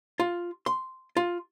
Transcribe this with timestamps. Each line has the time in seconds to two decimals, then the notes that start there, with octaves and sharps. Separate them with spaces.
0.20 F4
0.66 C6
1.17 F4